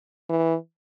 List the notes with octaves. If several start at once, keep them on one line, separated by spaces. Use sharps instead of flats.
E3